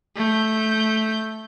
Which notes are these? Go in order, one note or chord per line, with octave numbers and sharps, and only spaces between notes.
A3 G6